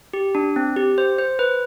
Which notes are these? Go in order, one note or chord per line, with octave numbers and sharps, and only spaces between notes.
G4
D4
C4
G4
C5
C5
B4